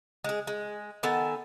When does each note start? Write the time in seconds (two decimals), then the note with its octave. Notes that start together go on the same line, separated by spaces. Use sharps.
0.24 G#3 G#4
0.47 G#3
1.03 D#3 B3 A4 G#5